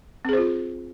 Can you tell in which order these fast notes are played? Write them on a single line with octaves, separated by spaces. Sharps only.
C4 G#4 C5 F4